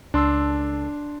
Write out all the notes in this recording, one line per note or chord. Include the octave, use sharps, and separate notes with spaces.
C#2 D4 A4 C6 E6